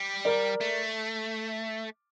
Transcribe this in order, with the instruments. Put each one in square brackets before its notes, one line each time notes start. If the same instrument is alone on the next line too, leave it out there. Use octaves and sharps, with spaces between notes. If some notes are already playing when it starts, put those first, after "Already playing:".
Already playing: [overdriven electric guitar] G3
[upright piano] A#4 D5
[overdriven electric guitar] A3